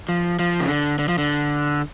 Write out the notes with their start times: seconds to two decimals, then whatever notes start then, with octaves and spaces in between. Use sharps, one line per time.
0.09 F3
0.39 F3
0.60 C#3
0.68 D3
0.99 D3
1.09 F3
1.18 D3